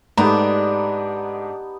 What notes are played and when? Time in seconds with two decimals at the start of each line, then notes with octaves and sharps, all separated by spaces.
0.17 G#2 A3 B3 D4 D#4 G4 A#5